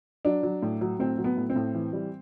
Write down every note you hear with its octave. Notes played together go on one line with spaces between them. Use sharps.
F#3 D4
F#3
A2
F#3
A2 C4
F#3
B3
A2
C4
A2
E3
G3